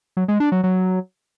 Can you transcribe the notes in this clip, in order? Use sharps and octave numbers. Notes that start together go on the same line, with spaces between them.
F#3
G#3
D4
F#3
F#3